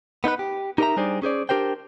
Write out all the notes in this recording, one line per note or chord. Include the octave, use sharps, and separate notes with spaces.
B3 D#4 E4 B4
G4
D#4 G4 A#4 D5 E5 A#5
G3 D4 D#4 G#4 C5 D5
C#4 G#4 C5 D5
D4 G4 A#4 C5 G5